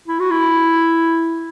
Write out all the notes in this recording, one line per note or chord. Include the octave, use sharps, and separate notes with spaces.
E4
F#4
E4